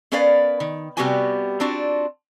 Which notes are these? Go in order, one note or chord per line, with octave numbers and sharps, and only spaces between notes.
B3 C#4 A#4 B4 D5 F5
D#3
C3 G3 B3 F#4 G4 G#5
C4 D4 F4 F#4